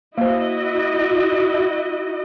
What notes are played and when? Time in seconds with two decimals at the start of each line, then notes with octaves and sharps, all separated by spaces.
0.18 A#3 E4 F#4 C5 D#5